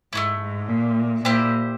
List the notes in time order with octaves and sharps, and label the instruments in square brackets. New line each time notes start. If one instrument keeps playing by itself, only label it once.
[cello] G#2 [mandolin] A3 C#4 E4
[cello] G#2
A#2
[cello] A#2 [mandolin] E4 G4 C5